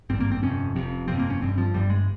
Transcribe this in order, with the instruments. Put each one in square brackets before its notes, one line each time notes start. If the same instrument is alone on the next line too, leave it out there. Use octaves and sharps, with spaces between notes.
[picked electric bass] G#1 G2 C4
A#3
C4
G1 F2 C3 C#4
F1 F2 C3
G1 F2 C3 C4
A#3
C#4
G1 G2 C4
F3
G1 G2 G3
G#3